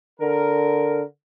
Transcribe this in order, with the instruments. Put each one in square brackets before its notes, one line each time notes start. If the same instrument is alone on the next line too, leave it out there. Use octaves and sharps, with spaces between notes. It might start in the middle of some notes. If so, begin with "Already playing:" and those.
[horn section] D3 A#4